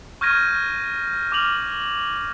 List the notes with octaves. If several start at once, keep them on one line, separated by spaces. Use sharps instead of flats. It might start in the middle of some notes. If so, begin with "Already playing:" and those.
C#6 F6 G6 G#6 A#6 D#7
D6 F6 F7 F#7